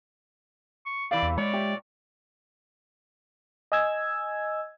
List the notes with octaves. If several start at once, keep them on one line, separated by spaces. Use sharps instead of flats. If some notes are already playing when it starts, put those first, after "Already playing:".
C#6
C3 E3 D5 F5
E2
A#2 G#3 C#5 D5 B5
G4 E5
D#5 G#5 E6 G#6